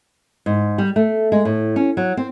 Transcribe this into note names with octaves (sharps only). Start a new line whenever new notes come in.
G#2
G3
A3
G#3
A2
C#4
F#3
C4